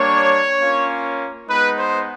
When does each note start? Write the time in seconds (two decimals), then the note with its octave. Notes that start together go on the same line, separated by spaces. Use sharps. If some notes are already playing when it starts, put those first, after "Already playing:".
Already playing: G3 A#3 D4 C#5
0.59 A#3 C#4 F4
1.49 G#3 B3 D#4 B4
1.78 C5